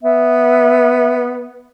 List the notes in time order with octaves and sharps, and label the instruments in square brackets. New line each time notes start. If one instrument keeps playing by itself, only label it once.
[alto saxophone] B3 [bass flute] E5